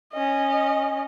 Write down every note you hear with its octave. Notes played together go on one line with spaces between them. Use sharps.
C#4 D#5